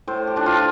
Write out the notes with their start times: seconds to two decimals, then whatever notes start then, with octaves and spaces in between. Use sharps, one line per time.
0.07 A2 C5
0.27 G4
0.36 F3 D4
0.46 F4